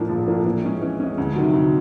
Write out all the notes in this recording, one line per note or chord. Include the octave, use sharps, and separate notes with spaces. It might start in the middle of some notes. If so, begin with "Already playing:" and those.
Already playing: A2 F3 A#3 D4
A#1
A2 F3 A#3 D4
E3
G#3 C#4
E3
G#3 C#4
D2
C3 D#3 F#3
D2